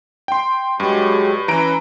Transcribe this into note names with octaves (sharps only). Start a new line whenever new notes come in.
G5 C6
G2 F#3 G#3 G4
E3 C#4 E4 B4 A#5 D7